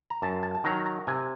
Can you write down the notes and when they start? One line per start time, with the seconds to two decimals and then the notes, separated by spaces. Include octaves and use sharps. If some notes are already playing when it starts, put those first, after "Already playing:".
0.10 A#5
0.22 F#2 A5
0.43 A5
0.55 A5
0.64 D#3 F#3 A#5
0.86 A#5
1.07 C3 G#5